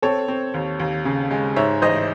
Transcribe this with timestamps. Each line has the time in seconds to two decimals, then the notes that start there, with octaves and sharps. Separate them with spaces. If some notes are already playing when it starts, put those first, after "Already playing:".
0.02 C4 A4 C#5
0.28 C4
0.54 D#2
0.80 D#2
1.05 C#3
1.31 G#3
1.56 G#2 C#5 E5
1.82 A1 C5 D#5